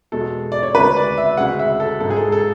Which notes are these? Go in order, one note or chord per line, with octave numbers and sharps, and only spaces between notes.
E2 B2 G#3 A4
D5
C#5
D2 C#3 G#3 B4
D5
E5
D2 C#3 G#3 F#5
E5
A4
G#2 G#3 A4
G#4
A4
A4